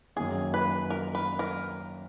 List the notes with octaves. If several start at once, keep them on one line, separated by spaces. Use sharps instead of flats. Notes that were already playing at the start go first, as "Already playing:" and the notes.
F#2 D#3 A#3 C#4 G#4
B4
A#4
B4
A#4